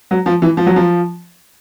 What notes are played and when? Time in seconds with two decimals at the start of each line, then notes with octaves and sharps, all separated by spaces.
0.11 F#3
0.26 F3
0.42 E3
0.57 F3
0.66 F#3
0.76 F3